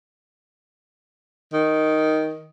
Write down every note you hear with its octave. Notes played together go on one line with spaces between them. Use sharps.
D#3